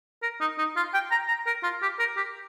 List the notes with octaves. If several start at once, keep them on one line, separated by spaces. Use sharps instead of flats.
A#4
D#4
D#4
F4
G5
A#5
A#5
A#4
F4
G4
A#4
G4